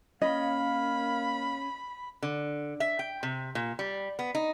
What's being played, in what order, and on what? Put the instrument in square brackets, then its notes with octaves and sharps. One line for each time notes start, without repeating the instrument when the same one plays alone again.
[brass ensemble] A#3 F5 [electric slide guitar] C#4 [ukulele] D#5 [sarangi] B5
[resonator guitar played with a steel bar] D3
E5
G5
C3
A#2
G3
B3
D#4